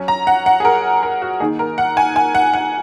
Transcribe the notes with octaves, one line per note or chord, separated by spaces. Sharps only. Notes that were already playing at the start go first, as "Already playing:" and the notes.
Already playing: F#3 C#4
A#5
F#5
F#5
G#4
A#4
A#4
F#4
D#3 A#3 D#4 G#4
A#4
F#5
G#5
G#5
F#5
F#5